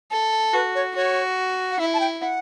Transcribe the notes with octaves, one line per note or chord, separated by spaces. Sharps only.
A4
F#4 B4
C#5
F#4 C#5
F#5
E4 E5
A5
G5
F#5